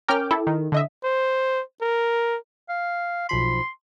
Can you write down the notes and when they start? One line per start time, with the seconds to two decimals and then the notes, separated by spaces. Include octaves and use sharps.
0.08 C#4 A#4 G5 D6 F6
0.31 E4 A4
0.47 D#3
0.72 D3 D#5 E5
1.04 C5
1.81 A#4
2.69 F5
3.29 B1 F3 B5 C6